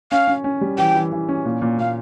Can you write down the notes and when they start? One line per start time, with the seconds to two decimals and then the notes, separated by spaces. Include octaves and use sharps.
0.11 C#4 F5
0.28 C#4
0.44 C#4
0.61 G3
0.78 E3 G5
0.95 E3
1.12 E3
1.29 C#4
1.45 A#2
1.62 A#2
1.79 A#2 F5